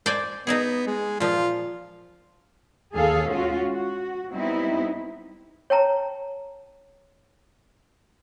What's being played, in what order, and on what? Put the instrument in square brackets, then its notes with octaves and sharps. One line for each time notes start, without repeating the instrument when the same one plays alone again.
[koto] C5 D5 G#5
[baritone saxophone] B3 [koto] D#4 E4 G#4
[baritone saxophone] G#3
[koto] A#2 F3 [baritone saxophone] F4
[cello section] D#2 G#4 A4 F5
G#3 C#4 F4 F#4
F#4
G3 B3 C4 D#4 E4
[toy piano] C#5 G5 A5 A#5